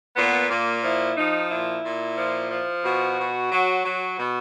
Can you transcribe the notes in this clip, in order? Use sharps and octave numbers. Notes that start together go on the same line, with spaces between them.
A#2 B3
A#2 A#3
F3 E4
F3 D#4
A#2 E4
A#2
F3
F3
B2 F#4
B2
F#3
F#3
B2 F#4